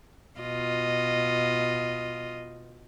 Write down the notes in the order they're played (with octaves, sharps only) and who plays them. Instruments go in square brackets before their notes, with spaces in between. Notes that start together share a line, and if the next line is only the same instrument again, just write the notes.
[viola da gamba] B2 F4 D#5